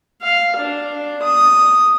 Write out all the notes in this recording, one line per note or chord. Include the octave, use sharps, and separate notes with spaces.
F5
D4
D#6